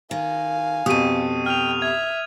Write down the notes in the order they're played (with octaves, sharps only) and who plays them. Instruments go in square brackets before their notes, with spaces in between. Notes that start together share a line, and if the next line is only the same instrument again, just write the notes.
[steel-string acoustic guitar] D#3 [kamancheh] F5 G#5
[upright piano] F2 B2 [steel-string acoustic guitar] G4 A4 [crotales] D#6 D#7
[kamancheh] G5 [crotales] F6 F7
[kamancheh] E5 [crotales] G#6